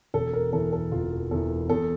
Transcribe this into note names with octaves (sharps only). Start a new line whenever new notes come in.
E1 A4
A#4
E2 E3 A4
A4
E1 F4
E2 E3 A4
E2 A4